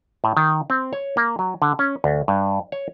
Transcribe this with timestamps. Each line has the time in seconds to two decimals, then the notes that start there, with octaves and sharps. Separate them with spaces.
0.24 A2
0.37 D#3
0.70 C4
0.93 C#5
1.17 A#3
1.39 F#3
1.62 D3
1.79 C#4
2.04 D2
2.28 G2
2.72 C#5